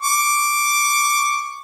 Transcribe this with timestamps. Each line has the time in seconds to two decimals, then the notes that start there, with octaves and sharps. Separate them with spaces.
0.01 C#6 D6